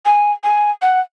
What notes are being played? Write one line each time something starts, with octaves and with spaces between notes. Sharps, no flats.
G#5
G#5
F#5